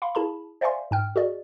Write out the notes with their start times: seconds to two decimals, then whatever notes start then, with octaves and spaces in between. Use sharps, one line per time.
0.02 F5 B5 C6
0.15 E4 G#4 A5 B5
0.61 C5 D5 E5 F5 G#5 C6
0.91 G#2 G5 F6
1.16 F#4 G#4 D5 D#5